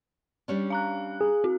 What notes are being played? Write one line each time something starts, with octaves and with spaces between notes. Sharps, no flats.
G3 C#4 D4
F5 A#5 F#6
G#4
C4 F#4